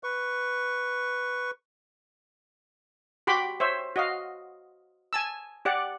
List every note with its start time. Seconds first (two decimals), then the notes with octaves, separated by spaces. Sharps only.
0.03 B4 C#6
3.27 F#4 G4 B5 C6 D6
3.60 C5 C#5 E5
3.96 F#4 D#5 F5
5.13 G#5 A5 E6
5.65 G4 D5 F#5